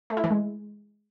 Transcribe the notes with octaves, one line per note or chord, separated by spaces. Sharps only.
A3
E4
E3
G#3